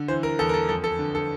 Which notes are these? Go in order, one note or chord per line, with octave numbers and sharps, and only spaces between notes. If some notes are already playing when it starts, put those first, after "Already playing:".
Already playing: D3
E3 C5
A#4
E2 A4
A#4
A4
F2 A4
A4
D3
A4